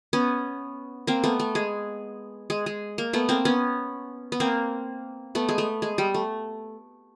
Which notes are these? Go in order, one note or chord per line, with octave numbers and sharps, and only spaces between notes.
B3 C#4
A#3 C4
A3 B3
A3
G#3
G#3
G#3
A#3
A3 B3
A#3 C4
B3 C#4
B3
A#3 C4
A3 B3
G#3
A3
G#3
G3
A3